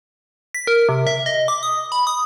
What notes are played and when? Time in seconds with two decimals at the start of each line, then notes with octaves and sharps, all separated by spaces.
0.54 B6
0.67 A#4
0.89 C3
1.07 E5
1.26 D#5
1.48 D6
1.63 D#6
1.92 B5
2.07 D#6